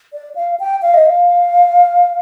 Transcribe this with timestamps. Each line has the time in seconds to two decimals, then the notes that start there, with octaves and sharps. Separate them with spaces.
0.13 D5
0.35 F5
0.60 G5
0.82 F5
0.94 D#5
1.06 F5